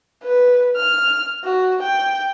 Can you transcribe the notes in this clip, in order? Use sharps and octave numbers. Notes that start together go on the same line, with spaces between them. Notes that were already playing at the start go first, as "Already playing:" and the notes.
B4
F6
F#4
G5